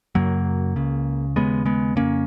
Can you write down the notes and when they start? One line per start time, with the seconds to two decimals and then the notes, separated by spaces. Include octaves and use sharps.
0.15 F#2 C#3 F#3 A#3
0.76 C#2 C#3
1.36 D#2 C#3 G#3 B3
1.66 G#3 B3
1.96 F2 C#3 A#3 C#4